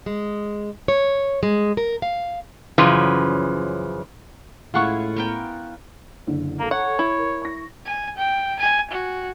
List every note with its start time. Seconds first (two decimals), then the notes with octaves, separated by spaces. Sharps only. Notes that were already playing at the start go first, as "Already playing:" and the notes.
0.06 G#3
0.88 C#5
1.43 G#3
1.77 A#4
2.02 F5
2.78 F#2 C#3 E3 F3
4.74 A2 G#3 C#4 E4 F4 F#5 C#6
5.16 B3 A#4 G5
6.27 F#1 D3
6.59 A#3 A4 A#5
6.71 C#5 F#5
6.99 E4
7.18 A#4
7.42 C#6 A#6
7.86 G#5
8.17 G5
8.60 G#5
8.91 F#4